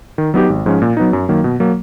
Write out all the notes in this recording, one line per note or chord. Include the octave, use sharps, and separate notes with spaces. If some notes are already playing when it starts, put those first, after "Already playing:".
D#3
F#3 B3 D#4 G4
G#1
G#2 F3 G#3 C#4
A#2
F#3 B3 D#4
F#2
D#3 F#3 A#3
B2
F#3 A#3